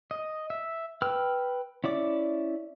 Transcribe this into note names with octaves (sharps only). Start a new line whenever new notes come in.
D#5
E5
B4 G5 E6 F6
C#4 E4 D5 D6